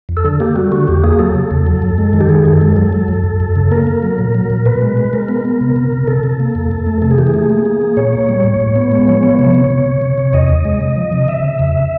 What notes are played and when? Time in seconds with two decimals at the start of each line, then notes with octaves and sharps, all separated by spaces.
0.09 F2
0.17 A4
0.25 D3
0.40 A#3 G4
0.56 G3 F#4
0.72 D3 F#4
0.87 E2 G4
1.04 A#3 G#4
1.19 F#3 A4
1.35 C#3
1.51 E2
1.67 F#3
1.82 F#2
1.98 G#3
2.13 D#3
2.21 G4
2.29 D#3 G#4
2.45 F#2
2.53 A4
2.61 G#3
2.76 F#3 A4
2.93 F#3
3.08 F#2
3.24 F#2
3.40 F#2
3.56 C#3
3.71 A#3 A#4
3.87 A#3
4.03 F#3
4.18 A#2
4.35 F#3
4.50 A#2
4.65 B2 B4
4.81 G#3
4.97 G#3
5.13 G#3 A#4
5.29 B3
5.45 B3
5.61 C3
5.76 C3
5.92 C3
6.07 C3 A4
6.23 C3
6.40 A#3
6.55 F2
6.71 F2
6.86 A3
7.02 C3 A4
7.11 G#4
7.18 E3 G4
7.27 G#4
7.34 A3
7.49 A#3
7.65 A#3
7.82 A#3
7.97 A#2 C#5
8.13 A#3
8.29 G3
8.44 A2
8.60 A2
8.75 B3
8.92 G#3
9.08 F3
9.23 B3
9.39 C3 C#5
9.55 C3
9.70 C3
9.86 C3
10.02 C3
10.18 C3
10.33 E2 D#5
10.49 E2
10.65 G#3
10.81 C3
10.96 F3
11.12 C3
11.28 C#3 E5
11.44 C#3
11.59 F2